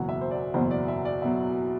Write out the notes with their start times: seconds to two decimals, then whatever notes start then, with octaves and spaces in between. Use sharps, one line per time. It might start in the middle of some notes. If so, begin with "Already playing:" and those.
Already playing: F#1 E2 B2 F#3 F#5
0.09 E5
0.21 C5
0.31 D5
0.54 F#1 E2 B2 F#3 C5
0.71 D5
0.88 E5
1.05 D5
1.22 B2 F#3 E5